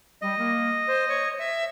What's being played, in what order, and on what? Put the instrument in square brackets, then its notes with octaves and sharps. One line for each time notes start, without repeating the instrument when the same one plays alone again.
[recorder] G3 [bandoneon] D#5
[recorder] A#3
C5
C#5
E5